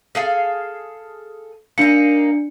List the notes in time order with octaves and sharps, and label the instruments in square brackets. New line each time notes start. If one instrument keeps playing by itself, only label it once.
[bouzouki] G#4 A4 F5
[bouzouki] A#3 D#4 [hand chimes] D4 C#7